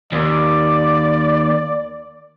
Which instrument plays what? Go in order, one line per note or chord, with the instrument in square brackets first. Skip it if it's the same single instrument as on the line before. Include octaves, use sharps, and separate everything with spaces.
[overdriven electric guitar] D#2 [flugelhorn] D5